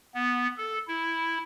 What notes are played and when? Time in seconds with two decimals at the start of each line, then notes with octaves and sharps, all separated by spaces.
0.15 B3
0.58 A4
0.88 E4